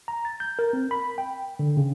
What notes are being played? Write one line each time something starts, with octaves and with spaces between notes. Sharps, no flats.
A#5
A6
G6
A#4
C4
B5
G5
D3
C#3